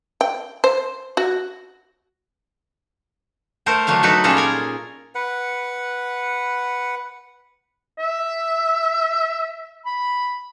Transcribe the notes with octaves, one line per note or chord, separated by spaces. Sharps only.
G5
C5
F#4
A3 A4 A#4 C5
D3 F#3 A3 D4 F5
F#3 D#4 F#4 A4 B4
A#2 G3 C#4 F4 G#4 A4
A#4 G#5 A#5
B4 F#5
E5
B5